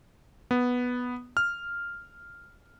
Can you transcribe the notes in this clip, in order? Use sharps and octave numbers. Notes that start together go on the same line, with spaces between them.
B3
F6